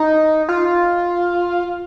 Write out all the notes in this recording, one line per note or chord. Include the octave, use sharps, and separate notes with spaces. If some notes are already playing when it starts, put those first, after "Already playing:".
Already playing: D#4
F4